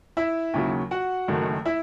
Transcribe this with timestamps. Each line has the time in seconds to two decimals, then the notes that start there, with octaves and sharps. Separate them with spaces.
0.17 E4 E5
0.53 D#2 C#3 F#3
0.91 F#4 F#5
1.28 F#1 F#2 D#3 A3
1.65 E4 E5